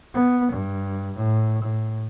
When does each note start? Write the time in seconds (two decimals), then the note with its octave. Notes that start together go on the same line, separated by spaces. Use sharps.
0.14 B3
0.53 G2
1.17 A2
1.63 A2